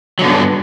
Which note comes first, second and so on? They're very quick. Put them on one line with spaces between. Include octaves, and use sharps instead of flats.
F#3 D3 B3 G2